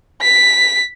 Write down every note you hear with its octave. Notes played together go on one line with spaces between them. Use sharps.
B6